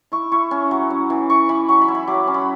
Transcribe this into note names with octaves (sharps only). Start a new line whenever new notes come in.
E4 C#6
E4 C#6
C#4
F#3
C#4
E3
E4 C#6
E3 B5
F#3 C#6
B5
E4
B5
F#3 D6
C#4
B5